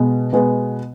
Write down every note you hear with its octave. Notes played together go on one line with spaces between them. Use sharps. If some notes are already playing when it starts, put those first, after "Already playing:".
Already playing: B2 G#3 B3
B2 G#3 B3